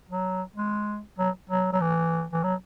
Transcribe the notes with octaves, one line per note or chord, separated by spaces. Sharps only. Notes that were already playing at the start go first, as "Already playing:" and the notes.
F#3
G#3
F#3
F#3
F#3
E3
E3
F#3